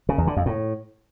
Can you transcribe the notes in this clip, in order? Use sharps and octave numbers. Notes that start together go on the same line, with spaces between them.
C#3
E2
D3
F2
A2